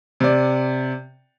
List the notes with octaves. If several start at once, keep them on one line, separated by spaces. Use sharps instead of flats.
C3 D5